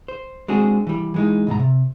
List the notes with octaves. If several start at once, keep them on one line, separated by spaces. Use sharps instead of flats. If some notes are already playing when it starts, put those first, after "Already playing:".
C5
G#3 C4 D4 F#4 G#4
E3 G3
E3 G#3 D#4
C#2 G#2 B2 A#5
C3